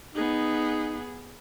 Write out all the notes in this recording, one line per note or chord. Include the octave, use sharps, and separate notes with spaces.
B3 D#4 G#4